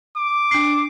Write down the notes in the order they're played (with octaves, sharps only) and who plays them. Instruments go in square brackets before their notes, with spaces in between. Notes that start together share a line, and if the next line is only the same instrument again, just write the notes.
[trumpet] D6
[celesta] D4 C7